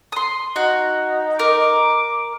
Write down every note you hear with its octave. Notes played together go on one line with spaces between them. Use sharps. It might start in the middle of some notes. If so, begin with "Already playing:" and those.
C6 D#6
D#4 F#4
A#4 D6